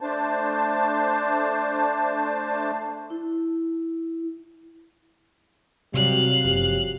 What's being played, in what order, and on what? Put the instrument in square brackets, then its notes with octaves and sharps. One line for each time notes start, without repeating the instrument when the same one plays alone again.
[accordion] A3 D4 C5 A5
[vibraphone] E4
[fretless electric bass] C3 [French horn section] F#3 G3 [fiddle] F5 F#6
[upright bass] F#1 [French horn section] F3 F#3 G4